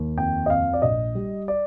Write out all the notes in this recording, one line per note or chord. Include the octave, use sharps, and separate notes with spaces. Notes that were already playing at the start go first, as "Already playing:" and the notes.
Already playing: D#2
F2 G5
D#5
F2 F5
D5
A#1 D#5
G3
D5